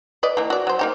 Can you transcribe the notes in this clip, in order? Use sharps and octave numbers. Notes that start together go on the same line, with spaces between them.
B4 D5 D#5
E3 A#3
F#4 D5
F#3 C5
A#3 D#4 G4